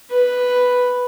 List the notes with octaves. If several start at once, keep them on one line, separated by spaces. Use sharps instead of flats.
B4